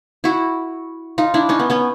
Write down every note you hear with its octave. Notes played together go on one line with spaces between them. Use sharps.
E4 F#4
D#4 F4
D4 E4
C#4 D#4
B3
B3 C#4